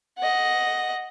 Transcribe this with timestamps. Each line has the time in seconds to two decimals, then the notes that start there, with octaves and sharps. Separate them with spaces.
0.18 D#5 F#5